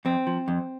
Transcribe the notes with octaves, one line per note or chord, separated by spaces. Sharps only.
F2 C4
F3
F2